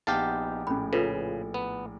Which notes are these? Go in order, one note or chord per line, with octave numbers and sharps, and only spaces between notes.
A#1 B3 D#4 G4 F5 F#5 A5
A#1 A2 C#4 B5
C#3 F4 A4 B4
B3